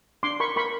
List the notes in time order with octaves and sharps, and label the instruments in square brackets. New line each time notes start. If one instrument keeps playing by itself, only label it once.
[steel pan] D4 C6 D6
A#4 B5 C#6
A#4 B5 C#6